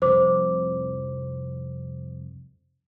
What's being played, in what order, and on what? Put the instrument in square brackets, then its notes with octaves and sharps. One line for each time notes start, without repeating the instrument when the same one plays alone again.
[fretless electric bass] F1 C2 F2 [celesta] C5 D6